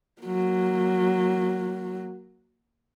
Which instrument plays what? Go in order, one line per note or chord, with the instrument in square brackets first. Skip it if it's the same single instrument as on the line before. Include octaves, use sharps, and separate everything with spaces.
[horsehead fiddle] F#3 A#3